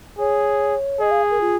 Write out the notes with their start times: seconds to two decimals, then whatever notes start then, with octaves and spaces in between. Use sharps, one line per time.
0.18 G#4 C#5
1.00 G#4 D#5
1.11 F5
1.31 A#4
1.41 F4